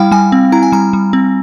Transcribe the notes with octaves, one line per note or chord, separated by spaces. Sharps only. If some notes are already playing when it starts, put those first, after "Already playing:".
Already playing: G3 E4 F5 G5
G3 G#5
C4
E4 A#5
G#5
G3 A#5
G3
C4